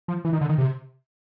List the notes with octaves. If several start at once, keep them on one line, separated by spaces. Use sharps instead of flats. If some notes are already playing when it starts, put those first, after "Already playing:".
F3
E3
D#3
D3
D#3
C3